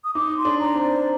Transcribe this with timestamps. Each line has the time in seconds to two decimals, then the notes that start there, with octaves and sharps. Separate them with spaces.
0.04 D#6
0.14 D#4 D6
0.37 C6
0.45 D4
0.59 A#5
0.74 C4
0.82 D5